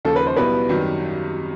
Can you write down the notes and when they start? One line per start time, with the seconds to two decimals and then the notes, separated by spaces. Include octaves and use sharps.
0.05 D#2 C#3 F3 A4
0.16 B4
0.27 C5
0.36 B1 B2 G3 B3 E4 B4
0.69 G#1 F#2 D#3 G3